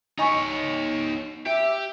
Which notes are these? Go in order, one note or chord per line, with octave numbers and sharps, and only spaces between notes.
D#4 C#5 D#5 G#5 C#6
G4 E5